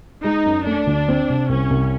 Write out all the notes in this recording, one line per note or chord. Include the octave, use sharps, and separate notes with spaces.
G#3 D#4
F#2
A3 D4
D2
C4
C3
C2 C#4
C2